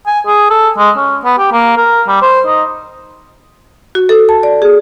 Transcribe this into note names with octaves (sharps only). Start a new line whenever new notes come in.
G#5
G#4
A4
G#3
C#4
B3
G4
A#3
A#4
G3
C5
D#4
F#4
A4
A5
D5
G#4